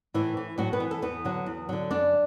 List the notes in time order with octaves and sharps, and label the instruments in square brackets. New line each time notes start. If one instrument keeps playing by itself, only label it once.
[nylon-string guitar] A2 E3 E4
E3
A2 F#3 F#4
B3 B4
E3
A4
E2 B3 B4
D3 F#3
E2
D3 F#3
F#2 D4 D5